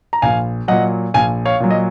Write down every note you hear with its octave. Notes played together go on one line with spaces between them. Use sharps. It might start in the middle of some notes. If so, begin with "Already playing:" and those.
A#5
A#1 F5 G#5
A#2 F#3 D#5 F#5
A#1 F5 G#5
C#5 F5
A#2 F#3
D#5